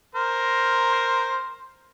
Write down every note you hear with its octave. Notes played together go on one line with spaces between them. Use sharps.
A#4 C5